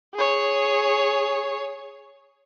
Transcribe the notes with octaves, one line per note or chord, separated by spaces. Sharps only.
G#4 C#5